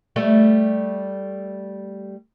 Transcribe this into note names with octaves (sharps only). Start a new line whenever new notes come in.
G3 A3